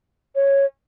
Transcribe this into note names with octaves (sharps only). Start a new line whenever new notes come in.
C#5